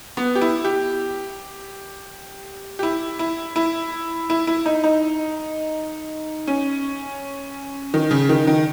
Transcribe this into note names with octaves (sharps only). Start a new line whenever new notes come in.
B3
G4
E4
G4
G4
E4
E4
E4
E4
E4
D#4
D#4
C#4
D#3
C#3
D#3
D#3